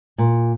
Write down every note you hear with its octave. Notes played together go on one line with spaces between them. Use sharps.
A#2